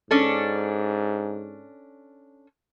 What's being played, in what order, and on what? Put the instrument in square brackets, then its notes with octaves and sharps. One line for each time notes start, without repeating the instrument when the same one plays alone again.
[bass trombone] G#2 [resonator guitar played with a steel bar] C#4 D4 A4